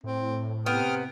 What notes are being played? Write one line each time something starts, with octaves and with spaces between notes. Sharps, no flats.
A2 C4
C3 B3 G5 D#6 F6